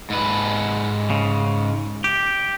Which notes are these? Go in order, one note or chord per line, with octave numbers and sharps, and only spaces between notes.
G#2 B4
C#3
G4